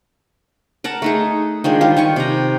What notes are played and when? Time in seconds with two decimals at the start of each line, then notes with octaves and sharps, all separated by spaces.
0.84 A#4 F#5 A5
1.02 A3 D#4 G#4
1.64 D#3 F3 G#3 D4
1.81 D#3 G3 F4
1.96 D#3 G#5 C#6
2.16 C3 A#5